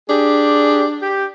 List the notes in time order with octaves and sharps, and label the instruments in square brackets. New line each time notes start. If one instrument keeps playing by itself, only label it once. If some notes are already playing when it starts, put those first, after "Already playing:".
[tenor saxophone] D4 [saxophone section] G4 G#4
[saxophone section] G4